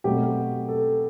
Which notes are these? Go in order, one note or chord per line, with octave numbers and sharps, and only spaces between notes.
B2 F#3 A3 C4 G4
A4